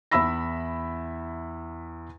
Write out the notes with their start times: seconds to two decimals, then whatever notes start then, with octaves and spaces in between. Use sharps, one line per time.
0.11 E2 E4 E5 B5 E6 A#6